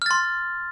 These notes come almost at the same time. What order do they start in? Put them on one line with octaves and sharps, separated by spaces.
F6 A6 C6